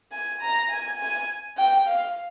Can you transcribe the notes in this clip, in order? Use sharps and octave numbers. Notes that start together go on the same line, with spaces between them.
G#5
A#5
G#5
G#5
G5
F5